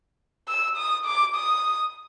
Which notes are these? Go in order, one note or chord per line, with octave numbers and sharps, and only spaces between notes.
E6
D#6
D6
D#6